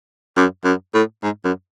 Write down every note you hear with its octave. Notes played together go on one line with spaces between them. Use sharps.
F#2
F#2
A2
G#2
F#2